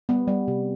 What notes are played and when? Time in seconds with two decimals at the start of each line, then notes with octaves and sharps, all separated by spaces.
0.09 G3 B3
0.28 G3
0.48 C3